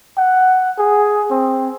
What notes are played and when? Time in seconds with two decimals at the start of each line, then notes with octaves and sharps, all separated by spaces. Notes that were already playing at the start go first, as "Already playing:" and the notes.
0.17 F#5
0.78 G#4
1.31 C4